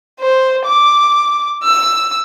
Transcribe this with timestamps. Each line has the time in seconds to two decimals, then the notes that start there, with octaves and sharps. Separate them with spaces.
0.20 C5
0.65 D6
1.64 E6